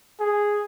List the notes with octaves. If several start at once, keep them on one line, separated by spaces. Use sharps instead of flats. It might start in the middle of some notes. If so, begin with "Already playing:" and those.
G#4